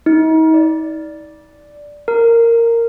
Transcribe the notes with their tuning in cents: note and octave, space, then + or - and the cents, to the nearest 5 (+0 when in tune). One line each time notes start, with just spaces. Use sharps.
D#4 +40
D5 -5
A#4 -10